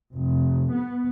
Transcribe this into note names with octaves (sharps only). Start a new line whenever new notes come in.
F1
B3